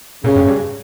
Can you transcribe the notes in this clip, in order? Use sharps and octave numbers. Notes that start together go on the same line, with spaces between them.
A#2 C#3
G2
G2